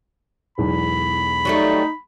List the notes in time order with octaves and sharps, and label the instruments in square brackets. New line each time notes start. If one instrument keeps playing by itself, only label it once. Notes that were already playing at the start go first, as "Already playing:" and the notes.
[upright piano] E1 B1 E2 [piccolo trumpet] B5
[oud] F#3 G3 A3 [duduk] D#4